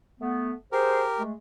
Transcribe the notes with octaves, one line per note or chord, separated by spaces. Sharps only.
A3 B3
G4 G#4 A#4 C5
G#3 A3